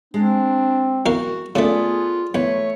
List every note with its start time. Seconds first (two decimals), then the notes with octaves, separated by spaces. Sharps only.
0.14 G#3 C4 D4
1.06 E2 F#4 A#4 F5
1.55 C#3 A3 B3 F4 G#4 A4 D5
2.35 E2 A3 B4 C#5